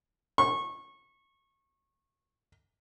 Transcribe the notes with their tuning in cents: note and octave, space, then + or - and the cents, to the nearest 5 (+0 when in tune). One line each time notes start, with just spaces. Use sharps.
C#6 -25